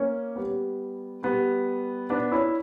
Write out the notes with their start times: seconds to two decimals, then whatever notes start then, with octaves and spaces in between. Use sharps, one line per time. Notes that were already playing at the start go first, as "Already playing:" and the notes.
Already playing: A#3 C#4
0.36 G3 B3
1.23 G3 B3
2.10 B3 D4
2.32 C#4 E4